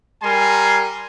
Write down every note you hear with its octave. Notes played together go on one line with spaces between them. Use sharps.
G3 A#4 G#5 C6